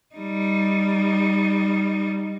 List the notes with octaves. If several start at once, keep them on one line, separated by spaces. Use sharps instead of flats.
G3 D#4